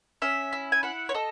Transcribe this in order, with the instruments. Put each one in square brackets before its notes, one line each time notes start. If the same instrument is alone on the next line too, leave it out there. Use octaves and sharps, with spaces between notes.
[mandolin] C#4 E5
E4
G#5
E4 F#5
C#5
A4 D#5